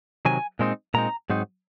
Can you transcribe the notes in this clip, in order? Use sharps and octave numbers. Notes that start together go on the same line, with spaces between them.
C3 D#3 F#3 G#5
A#2 G#3 C4 D#4
A#2 G#3 C4 D#4 A#5
G#2 F#3 C4 D#4